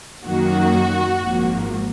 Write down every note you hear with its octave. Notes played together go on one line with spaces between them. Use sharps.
F#2 D#3 F#3 A#3 F#4
G#1 G#2 F3 A#3